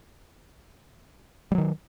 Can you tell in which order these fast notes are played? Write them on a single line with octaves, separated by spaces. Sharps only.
G3 F#3 D#3